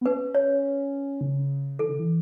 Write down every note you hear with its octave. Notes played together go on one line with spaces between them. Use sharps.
B3
C#4 B4
C#5
C#3
E3 A4
C#3
E3